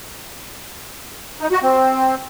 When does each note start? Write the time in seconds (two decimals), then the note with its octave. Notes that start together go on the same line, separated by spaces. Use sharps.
1.40 D#4
1.51 F#4
1.63 C4